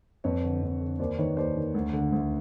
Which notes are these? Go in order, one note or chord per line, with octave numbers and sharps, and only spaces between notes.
F2 B4 C#5
D3
F2
D3
D#2 C5 D5
D#3 B4 C#5
D#2 C5 D5
D#3
D2
D3
D2